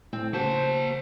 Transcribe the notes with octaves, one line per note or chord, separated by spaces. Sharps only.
A2 C4
C#3 A#3 F#4 C5 A5